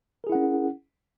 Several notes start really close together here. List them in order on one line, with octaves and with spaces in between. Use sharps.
A#4 G#4 E4 F#5 C#4